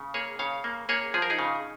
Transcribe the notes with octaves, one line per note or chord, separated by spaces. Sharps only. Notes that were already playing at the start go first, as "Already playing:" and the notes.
Already playing: C#3
A#3 G#4 C#5
C#3 C#5 F5
A#3
A#3 G#4 C#5
F3 G#4
A#4
D#4 G#4
C#3